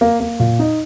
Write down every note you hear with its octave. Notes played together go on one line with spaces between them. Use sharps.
A#3
A#3
A#2
D#4